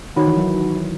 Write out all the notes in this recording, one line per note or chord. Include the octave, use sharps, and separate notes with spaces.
D#3 D#4 F#4 C#5 F#5 B5
E3
F#3